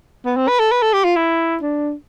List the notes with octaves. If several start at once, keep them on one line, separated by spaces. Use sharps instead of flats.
B3
C4
B4
A4
B4
A4
G4
F4
E4
D4